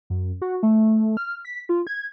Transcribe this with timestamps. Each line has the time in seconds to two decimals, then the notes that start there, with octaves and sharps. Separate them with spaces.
0.10 F#2
0.42 F#4
0.63 A3
1.17 F6
1.45 B6
1.69 F4
1.87 G#6